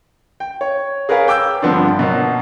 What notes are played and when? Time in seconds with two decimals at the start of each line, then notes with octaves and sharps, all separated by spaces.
0.40 G5
0.61 C#5
1.09 G#4 A#4 B4 C#5 F5
1.28 G5 D6 E6 G6
1.62 G2 D3 F3 B3 C4 D4
1.99 B2 F#3 A#3